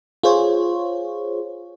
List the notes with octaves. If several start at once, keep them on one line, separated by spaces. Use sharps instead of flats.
F4 G#4 C5 C#5